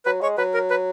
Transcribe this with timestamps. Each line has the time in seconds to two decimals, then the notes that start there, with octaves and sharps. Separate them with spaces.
0.06 F#3 B4
0.21 G#3 C#5
0.38 F#3 B4
0.54 A#4
0.70 B4